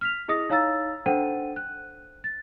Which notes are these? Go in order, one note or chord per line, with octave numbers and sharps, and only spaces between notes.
F6 B6 F7
E4 G#4 D#5 D#6 A#6
D#4 C#5 F5 A#5 E6 A6
D4 A4 C5 F#5 G5 D#7
F#6
A6